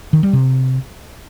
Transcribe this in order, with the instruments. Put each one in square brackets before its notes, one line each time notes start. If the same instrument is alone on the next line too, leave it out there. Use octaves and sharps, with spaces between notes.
[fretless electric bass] D#3
G3
C3